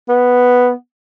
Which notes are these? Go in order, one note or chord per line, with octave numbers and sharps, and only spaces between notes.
B3